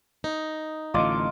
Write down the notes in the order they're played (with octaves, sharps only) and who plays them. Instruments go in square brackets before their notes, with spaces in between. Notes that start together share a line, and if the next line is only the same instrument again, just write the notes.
[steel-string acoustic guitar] D#4
[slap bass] A1 D3 [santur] F4 D#5 D6